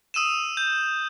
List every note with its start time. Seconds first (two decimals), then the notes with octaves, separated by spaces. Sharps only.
0.14 D#6 E6 D#7 E7
0.57 G6